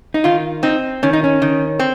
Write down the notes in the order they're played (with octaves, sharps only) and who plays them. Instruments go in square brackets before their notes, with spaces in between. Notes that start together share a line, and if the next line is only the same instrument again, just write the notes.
[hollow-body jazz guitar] D#4
[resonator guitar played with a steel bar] D#3 [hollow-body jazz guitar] F4
[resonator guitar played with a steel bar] C4 [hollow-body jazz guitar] D#4
[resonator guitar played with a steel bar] D#3 [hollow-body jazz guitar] C#4
[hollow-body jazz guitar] D#4
C#4
[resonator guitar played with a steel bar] D#3
C4